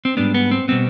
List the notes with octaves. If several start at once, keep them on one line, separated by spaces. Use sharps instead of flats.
C4
G#2 G3 B3 D4
B3
C4
B2 G3 B3 C4